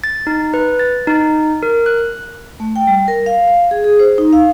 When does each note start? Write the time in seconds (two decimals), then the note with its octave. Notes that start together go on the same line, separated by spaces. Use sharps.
0.04 A6
0.27 D#4
0.54 B4
0.79 A6
1.07 D#4
1.63 A#4
1.86 F#6
2.60 A3
2.76 G5
2.87 G3
3.08 A#4
3.26 F5
3.48 F5
3.71 G#4
3.84 G#4
3.99 C5
4.18 D#4
4.33 F5